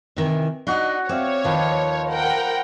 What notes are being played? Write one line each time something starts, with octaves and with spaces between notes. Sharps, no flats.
C3 D#3 E3
D4 D#4 F#4 D#5 F#5
C4 C#5 D5 E5 F5
D#2 D#3 F3 B4 C5
A#4 F#5 G5